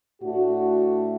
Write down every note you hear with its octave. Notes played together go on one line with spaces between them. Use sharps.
A2 A3 D4 F#4